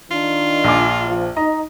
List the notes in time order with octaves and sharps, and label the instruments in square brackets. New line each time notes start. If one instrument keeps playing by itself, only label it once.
[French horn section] D#3 D4 [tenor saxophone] F4
[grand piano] A#1 G#5 D6
[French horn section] F3
[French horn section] D#4 [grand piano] D#5 A#5